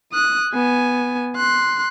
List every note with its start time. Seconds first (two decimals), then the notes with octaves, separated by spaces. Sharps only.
0.13 D#6 F#6
0.54 B3 G#5
1.37 C6 F#6